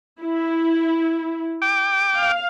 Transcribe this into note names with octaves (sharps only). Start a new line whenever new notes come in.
E4
G5 D6
F5